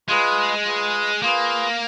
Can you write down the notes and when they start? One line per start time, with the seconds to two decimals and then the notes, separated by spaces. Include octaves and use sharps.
0.08 G#3 F4 G#4 B4
0.65 F4 G#4 B4
1.23 A#3 F4 G#4 B4